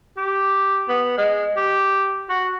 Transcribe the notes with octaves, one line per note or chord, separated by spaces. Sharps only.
G4
B3
G#3
G4
F#4